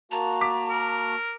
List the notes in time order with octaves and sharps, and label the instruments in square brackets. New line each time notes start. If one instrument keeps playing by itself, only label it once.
[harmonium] A#3 F#4 A5 [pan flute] A#5
[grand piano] D6 B6
[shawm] A#4